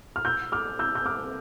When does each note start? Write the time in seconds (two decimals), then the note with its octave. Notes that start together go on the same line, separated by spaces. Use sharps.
0.16 F6
0.25 E6 G6
0.52 D6 F6
0.79 E6 G6
0.95 G6
1.06 D6 F6